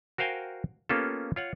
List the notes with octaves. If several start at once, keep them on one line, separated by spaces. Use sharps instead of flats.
F#4 A#4 C5 F5 G5 G#5
A#3 B3 C#4 F4 G4 A4
F4 C#5 F#5